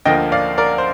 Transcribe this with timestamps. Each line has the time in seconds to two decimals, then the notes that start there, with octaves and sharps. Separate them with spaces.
0.05 D2 D3 F3 A#3 D#5 G5
0.32 D5 F5
0.58 A#4 D5
0.78 C5